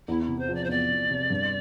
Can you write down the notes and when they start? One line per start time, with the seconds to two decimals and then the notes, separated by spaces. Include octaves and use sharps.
0.07 E2 E4
0.23 E4
0.28 C3
0.38 C5
0.48 F3
0.54 D5
0.64 C5
0.69 E2 D5
0.90 E2
1.11 C3
1.30 G2